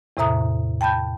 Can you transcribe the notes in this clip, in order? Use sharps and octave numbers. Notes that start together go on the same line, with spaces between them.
E2 A2 C3 E5 A#5 D#6
G5 A5 B5 G6